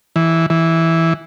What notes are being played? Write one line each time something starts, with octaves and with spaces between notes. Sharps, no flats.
E3
E3